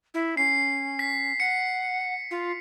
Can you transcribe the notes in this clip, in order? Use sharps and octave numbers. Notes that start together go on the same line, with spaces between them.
E4
C#4 C7
B6
F#5 C#7
F4